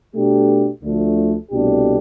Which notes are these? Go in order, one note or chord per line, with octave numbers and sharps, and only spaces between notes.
B2 A3 D4 G4
D2 D3 F3 A3
C2 B2 A3 D4 G4